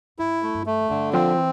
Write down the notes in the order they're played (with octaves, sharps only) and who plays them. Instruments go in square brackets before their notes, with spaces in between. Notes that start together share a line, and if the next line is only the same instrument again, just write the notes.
[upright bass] G2 [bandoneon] E4
[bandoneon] A3
[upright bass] G2
[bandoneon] A3
[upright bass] F2
[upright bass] G2 [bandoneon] D3
[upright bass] F3 [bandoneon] C4
[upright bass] E3